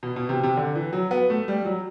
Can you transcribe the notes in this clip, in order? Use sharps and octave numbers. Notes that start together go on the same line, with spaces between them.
B2
B2
C3
C3
D3
E3
F#3
B3
A3
G3
F#3